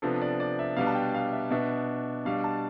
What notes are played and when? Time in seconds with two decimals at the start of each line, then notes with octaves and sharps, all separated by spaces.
0.02 C3 F3 B3 D4 A4
0.21 D5
0.40 D5
0.59 E5
0.77 B2 G3 B3 D4 F5
0.87 A5
0.95 G5
1.15 F5
1.33 E5
1.51 B2 B3 D4 E5
2.25 B2 G3 D4 F5
2.44 A5